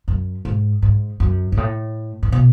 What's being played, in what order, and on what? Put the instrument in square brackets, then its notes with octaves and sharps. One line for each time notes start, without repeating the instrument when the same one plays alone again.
[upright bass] F#2
G#2
G#2
F#2
G#2
A2
A2
B2